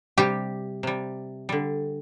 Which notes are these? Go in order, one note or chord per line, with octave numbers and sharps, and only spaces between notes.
C3 G3 G4
C3 G3
D3 G3